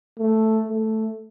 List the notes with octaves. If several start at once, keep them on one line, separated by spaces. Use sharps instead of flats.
A3
A3